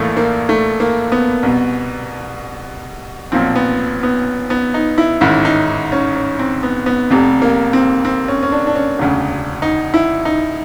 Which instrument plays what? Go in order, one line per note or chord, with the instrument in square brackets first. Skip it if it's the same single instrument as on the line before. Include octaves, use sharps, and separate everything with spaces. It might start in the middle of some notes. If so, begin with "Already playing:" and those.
Already playing: [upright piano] A#1 A2 E3 A3 A#3
A#3
A3
A#3
B3
C2 B2
B1 A#2 F3 C4
B3
B3
B3
D#4
E4
A1 G#2 D#3 E4
D#4
C#4
C#4
C4
B3
B3
F1 F2 C3
A#3
C4
C4
C#4
C#4
D4
D4
C#4
E1 D2 C#3 D4
D#4
E4
D#4